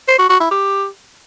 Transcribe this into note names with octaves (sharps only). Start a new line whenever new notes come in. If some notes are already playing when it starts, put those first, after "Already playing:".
C5
F#4
F#4
E4
G4